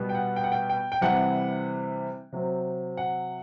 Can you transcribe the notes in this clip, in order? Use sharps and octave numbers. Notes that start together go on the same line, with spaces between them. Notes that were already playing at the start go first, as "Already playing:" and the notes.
Already playing: B2 G3 B3
G5
F#5
G5
F#5
G5
G5
G5
C3 E3 G3 C4 F#5
C3 F#3 C4
F#5